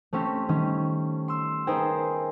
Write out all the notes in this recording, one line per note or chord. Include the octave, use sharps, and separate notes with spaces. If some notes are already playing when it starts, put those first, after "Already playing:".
A3 C4 C#4 G4
D#3 G3 C#4
C6 E6
B3 D#4 G#4 A#4 C5 G5